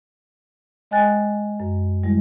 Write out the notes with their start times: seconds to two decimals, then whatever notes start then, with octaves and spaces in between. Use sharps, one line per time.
0.91 G#3 D#5 G5 G#5 F#6 A6
1.60 F#2
2.03 D#3 G3 G#3 E4